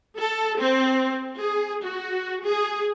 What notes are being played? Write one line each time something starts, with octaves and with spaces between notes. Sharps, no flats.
A4
C4
G#4
F#4
G#4